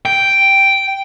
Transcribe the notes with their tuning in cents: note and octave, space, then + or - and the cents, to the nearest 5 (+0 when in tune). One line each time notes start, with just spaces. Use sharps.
G5 +0